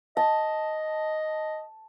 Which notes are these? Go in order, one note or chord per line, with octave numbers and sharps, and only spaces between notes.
D#5 A5